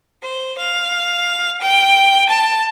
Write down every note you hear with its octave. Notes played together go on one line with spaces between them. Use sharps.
C5
F5
G5
A5